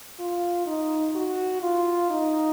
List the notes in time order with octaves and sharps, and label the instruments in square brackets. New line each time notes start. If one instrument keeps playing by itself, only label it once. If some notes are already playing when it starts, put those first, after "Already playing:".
[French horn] F4
D#4
F#4
F4
D#4